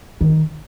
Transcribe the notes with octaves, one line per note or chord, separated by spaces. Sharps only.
D#3